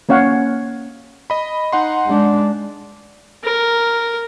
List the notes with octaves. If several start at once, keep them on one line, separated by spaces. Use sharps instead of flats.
A#3 C#4 C#5 F5 F#5
D#5 B5
D#4 F#5 C6
G#3 D4
A#4